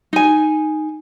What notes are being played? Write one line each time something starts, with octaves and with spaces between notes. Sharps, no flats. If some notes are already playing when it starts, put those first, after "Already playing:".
D#4 G#5